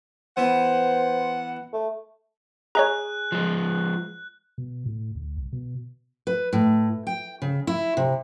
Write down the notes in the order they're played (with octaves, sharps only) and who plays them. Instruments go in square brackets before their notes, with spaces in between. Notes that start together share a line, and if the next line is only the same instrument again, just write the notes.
[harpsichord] E3 B3 [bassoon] C5 [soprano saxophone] F#5
[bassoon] A3
[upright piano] G#4 [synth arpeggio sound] C#5 D#5 A#5 [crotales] F#6
[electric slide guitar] F3 G#3
[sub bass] B2
A2
D2
C2
B2
[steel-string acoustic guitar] B4
A2
G5
C#3
E4
C3